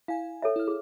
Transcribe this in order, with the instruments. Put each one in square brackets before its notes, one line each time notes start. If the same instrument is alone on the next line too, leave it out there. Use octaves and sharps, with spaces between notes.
[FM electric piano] E4 G#5 [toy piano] F5
[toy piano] A4 C#5 E5
[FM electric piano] E4 F6
[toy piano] G#4